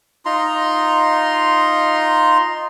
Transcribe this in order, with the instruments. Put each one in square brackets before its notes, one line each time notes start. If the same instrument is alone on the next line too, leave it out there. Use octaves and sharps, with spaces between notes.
[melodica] D#4 F4 A#5 C6